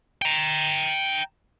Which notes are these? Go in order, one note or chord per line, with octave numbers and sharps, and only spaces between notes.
G5 A#5